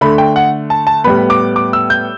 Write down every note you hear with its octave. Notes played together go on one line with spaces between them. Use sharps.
D3 A3 B5
G5
F#5
A5
A5
A2 G3 B3 B5
D6
D6
E6
G6